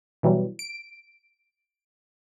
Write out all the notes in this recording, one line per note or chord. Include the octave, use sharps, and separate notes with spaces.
B2 E3 F#3 G3
D7